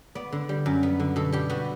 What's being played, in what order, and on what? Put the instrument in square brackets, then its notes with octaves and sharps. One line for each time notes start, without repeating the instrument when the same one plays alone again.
[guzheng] B3 D5
D3
G3
F#2
B3
D3
B2 A4
G3 G4
B3 F#4